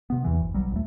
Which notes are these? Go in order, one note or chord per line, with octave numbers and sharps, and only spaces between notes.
C3 B3
E2 E3
F#1
B1 F#3 G3
D#1 A3